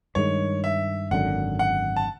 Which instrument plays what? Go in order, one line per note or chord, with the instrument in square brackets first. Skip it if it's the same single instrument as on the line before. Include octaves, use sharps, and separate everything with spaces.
[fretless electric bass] G2 D#3 G#3 [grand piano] C#5
[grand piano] E5
[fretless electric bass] G#1 F#2 D3 [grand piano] F#5
[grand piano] F#5
A5